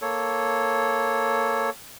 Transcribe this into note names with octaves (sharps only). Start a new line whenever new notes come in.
A#3 A4 C#5